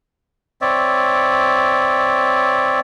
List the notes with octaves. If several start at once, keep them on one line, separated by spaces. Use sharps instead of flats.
C4 C#5 D5 E5